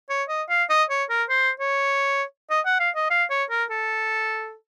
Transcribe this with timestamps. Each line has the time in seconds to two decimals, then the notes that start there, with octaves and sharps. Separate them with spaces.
0.10 C#5
0.29 D#5
0.50 F5
0.69 D#5
0.90 C#5
1.10 A#4
1.29 C5
1.60 C#5
2.50 D#5
2.65 F#5
2.80 F5
2.95 D#5
3.10 F5
3.30 C#5
3.50 A#4
3.70 A4